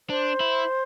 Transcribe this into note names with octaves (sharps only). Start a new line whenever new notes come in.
D4 C5
E4